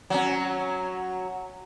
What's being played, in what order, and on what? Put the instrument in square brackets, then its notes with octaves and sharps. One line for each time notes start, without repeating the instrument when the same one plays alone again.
[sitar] F#3 C#4